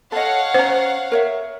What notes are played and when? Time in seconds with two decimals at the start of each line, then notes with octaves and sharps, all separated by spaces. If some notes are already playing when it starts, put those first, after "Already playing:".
0.12 A4 C#5 D#5 F5 F#5
0.54 C#4 C5 A#5
1.12 A#4 C#5 E5